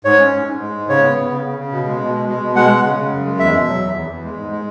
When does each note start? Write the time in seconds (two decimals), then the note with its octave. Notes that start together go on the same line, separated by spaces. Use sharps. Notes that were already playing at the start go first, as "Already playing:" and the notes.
0.05 G#2 C#5
0.19 C#4
0.33 G#2
0.47 G#2
0.61 G#3
0.74 G#2
0.89 C#3 C#5
1.03 B3
1.17 C#3
1.31 C#3
1.45 C#3
1.58 C#3
1.72 B2
1.87 G#3
2.01 B2
2.14 G#3
2.29 G#3
2.42 B2
2.56 G#3 F#5
2.70 G#3
2.84 C#3
2.98 C#3
3.12 F#2
3.26 G#3
3.39 E2 E5
3.53 B2
3.68 F#3
3.82 E2
3.95 E2
4.10 E2
4.24 G#3
4.37 G#2
4.52 G#3